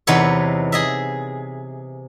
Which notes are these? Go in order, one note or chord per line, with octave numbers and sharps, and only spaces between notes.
E2 C3 D#4 B4 C#5 E5
G#4 D#5 E5